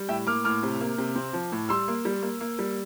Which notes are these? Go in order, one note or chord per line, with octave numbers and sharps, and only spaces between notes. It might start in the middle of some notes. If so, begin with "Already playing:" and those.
Already playing: G3
A2 E5 G5
A#3 D6 F6
A2 D6 F6
C3
A#3
C3
C4
F3
A2
G3 C6 E6
A#3
G3
A#3
A#3
G3